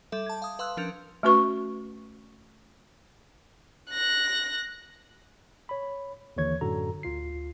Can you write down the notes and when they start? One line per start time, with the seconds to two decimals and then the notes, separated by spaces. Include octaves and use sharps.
0.12 G3 A4 E5
0.26 A5 G#6
0.42 F5 D#6
0.59 B4 F5 C6 D#6 E6 F#6
0.77 F3 C#4 D4 A#4 G6 F7
1.23 A3 C#4 F#4 B4 C#6
3.91 F#6 A#6
5.69 C#5 B5
6.37 D#2 D3 E3 C#5 G#6
6.61 F#2 A2 D3 F#4 A4 A#5
7.03 D2 F4 C7